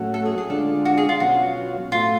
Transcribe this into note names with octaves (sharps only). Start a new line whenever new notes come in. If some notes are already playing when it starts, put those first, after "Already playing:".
Already playing: A2 F#3 A3 C#4 F#4
A4
G#4
G#4
D3 G#3 D4 F4 A4
F#4
G#4
F4
B2 F#3 C#4 F4 F#4
A2 F#3 A3 F4